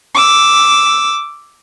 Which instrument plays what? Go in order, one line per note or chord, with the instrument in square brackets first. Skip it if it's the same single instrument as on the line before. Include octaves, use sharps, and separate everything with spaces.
[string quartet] D6 E6